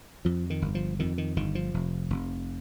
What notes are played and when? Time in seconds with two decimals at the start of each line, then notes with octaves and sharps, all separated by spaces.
0.25 F2 F3
0.50 D#3
0.62 G1
0.75 F3
0.99 F2 D#3
1.18 D#3
1.36 G1 D#3
1.55 F3
1.74 F1
2.10 F1